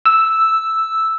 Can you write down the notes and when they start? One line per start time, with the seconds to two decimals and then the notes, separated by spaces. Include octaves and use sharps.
0.06 E6